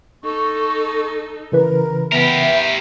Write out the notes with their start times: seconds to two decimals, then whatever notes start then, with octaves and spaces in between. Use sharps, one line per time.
0.24 D#4 A4 C#6
1.52 C#3 E3 A#4 B4
2.12 B3 G4 A#4 E5